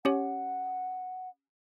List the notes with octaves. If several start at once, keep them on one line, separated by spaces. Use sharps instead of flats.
C#4 G4 C#5 F#5